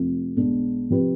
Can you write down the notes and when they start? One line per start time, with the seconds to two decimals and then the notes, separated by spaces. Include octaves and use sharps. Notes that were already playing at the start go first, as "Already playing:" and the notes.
Already playing: F1 F2 C3 F3
0.36 B1 B2 G#3 D4
0.90 C3 F3 C4 G4 B4